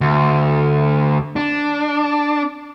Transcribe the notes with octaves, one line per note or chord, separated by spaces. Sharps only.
D2
D4